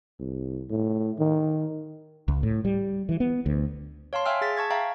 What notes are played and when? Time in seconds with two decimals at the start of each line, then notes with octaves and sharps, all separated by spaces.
0.20 C2
0.70 A2
1.19 D#3
2.28 C#2
2.43 A2
2.65 G3
3.09 E3
3.20 B3
3.46 D2
4.13 C#5 F5 A5 C6
4.26 E5 F5 G5 G#5 E6 F6
4.41 G#4 A6 B6
4.56 A5 C#6 G#6 A6
4.70 E5 F5 G5 A#5